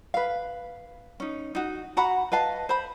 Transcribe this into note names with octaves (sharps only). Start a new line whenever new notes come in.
B4 F5
C#4 D#4
D#4 F#4
F#4 F#5 A#5 B5
B4 D#5 F5 A5
C5 B5